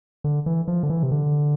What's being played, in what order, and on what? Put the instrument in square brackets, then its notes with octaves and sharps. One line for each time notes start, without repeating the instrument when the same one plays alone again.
[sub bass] D3
E3
F3
D3
E3
C3
D3